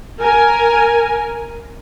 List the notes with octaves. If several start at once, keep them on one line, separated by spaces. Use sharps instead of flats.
A#4 G#5